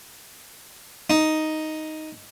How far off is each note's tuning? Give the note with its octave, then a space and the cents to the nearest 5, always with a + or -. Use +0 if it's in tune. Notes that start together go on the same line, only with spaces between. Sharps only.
D#4 +5